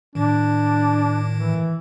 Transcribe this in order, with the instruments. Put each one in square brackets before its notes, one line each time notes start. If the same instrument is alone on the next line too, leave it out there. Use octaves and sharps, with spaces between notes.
[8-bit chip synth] A2 D#3 [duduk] D4
[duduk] E3